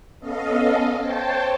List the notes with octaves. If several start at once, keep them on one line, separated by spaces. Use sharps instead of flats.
B3 C#4 A4 D#5 F5
C5 C#5 G5 A5